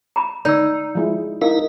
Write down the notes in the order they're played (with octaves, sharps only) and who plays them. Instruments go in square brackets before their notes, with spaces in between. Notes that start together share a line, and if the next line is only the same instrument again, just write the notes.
[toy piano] A#5 B5
[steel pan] D3 [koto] D#4 [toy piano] D5 E6
[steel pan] F3 G#3 E4
[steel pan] D#4 [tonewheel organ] E4 A#4 [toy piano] F5